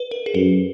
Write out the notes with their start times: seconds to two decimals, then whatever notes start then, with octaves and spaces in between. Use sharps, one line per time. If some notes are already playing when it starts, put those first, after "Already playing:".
Already playing: B4
0.11 A#4
0.26 G#4
0.35 F#2 A4